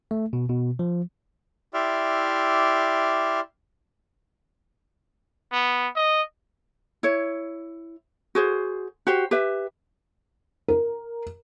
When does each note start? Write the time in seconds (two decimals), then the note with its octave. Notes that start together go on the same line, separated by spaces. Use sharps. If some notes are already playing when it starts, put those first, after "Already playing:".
0.11 A3
0.33 B2
0.49 B2
0.79 F3
1.74 E4 G4 D5 E5 C6 F6
5.52 B3
5.96 D#5
7.03 E4 C#5
8.35 F#4 G#4 C5
9.07 F#4 G4 C5
9.31 G4 B4 E5
10.68 A#4